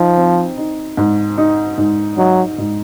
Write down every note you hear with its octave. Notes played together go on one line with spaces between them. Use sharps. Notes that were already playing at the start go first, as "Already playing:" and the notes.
Already playing: F3 D#4
C4
D#4
G#2
D#4
G#2
F#3 D#4
G#2